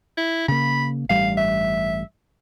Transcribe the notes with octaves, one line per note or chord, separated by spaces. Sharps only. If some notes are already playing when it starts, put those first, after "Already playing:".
E4
C#3 A#3 B5
A1 G2 G3 F5
E5